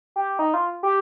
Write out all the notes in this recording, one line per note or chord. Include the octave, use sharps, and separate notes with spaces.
G4
D#4
F4
G4